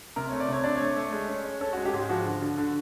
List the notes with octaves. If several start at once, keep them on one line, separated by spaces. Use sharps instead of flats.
C3 A#4
A3 C#5
D5
C3 C#5
D4 D5
A3 C#5
A3
G#3
C#4
C#4
C#4 A4
F#4
G#3
G4
G#2
F3 F#4
D3
D3
D3